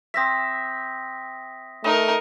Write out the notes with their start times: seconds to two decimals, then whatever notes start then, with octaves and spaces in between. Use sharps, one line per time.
0.14 C4 E5 D#6 A#6 B6
1.84 A3 D#4 A#4 D#5